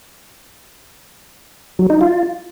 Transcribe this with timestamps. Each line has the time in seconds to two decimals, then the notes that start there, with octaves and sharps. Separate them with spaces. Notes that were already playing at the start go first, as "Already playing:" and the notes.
1.79 F#3
1.90 D#4
2.01 F4